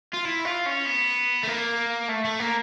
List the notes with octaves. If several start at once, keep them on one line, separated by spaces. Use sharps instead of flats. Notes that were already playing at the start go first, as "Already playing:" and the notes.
F4
E4
F4
C#4
B3
A3
A#3
A3
A3
A#3